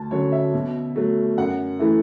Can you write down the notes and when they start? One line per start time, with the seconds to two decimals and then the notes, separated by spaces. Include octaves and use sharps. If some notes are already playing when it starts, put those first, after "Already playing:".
Already playing: D2 A5
0.11 D3 F#3 C#4 C#5
0.32 E5
0.54 B2
0.96 F#3 A3
1.38 F#2 F#5
1.79 E3 A3 E4